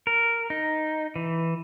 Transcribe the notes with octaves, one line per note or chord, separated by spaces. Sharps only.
A#4
D#4
E3